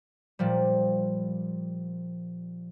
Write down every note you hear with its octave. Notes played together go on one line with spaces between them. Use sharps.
A#2 F3 G3